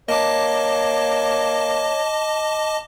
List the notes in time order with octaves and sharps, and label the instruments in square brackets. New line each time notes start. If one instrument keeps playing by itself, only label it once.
[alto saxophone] A#3 [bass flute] C#5 [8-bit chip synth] D#5 A5 D6